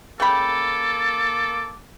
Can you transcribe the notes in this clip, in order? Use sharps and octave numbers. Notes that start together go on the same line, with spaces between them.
C#3 A#3 A4 G5 B5 D6